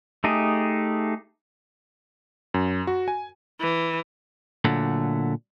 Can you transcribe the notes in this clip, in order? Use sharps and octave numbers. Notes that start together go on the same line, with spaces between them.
A3 D#4 G4 G#4
F#2
F#4
G#5
E3
A#2 D3 F#3 A3